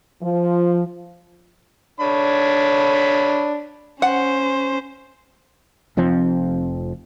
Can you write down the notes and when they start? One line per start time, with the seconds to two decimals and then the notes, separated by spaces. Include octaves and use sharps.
0.23 F3
2.00 D4 C#5 B5
4.02 C#4 C5 F#5
5.97 F1 F2 F3 C4